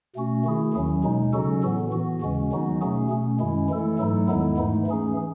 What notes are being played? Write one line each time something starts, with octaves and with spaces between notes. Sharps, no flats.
B2 A3 C#4 F#4
D#3 A3 E4 G#4
D#2 D#3 F#3 C#4
B2 G#3 D#4
C#3 F#3 C#4 F#4 A4
A2 E3 B3
E3 B3 F#4
D#2 C#3 G#3 C#4
D#3 F#3 B3 D#4 F#4
B2 A3 C#4 G#4
B2 A3 C#4
F#2 D#3 G#3 C#4 E4
E3 A3 E4 A4
G#2 F#3 A3 D#4 A4
E2 D#3 G#3 B3 E4
G#2 E3 A3 D#4
E3 A3 C#4 G#4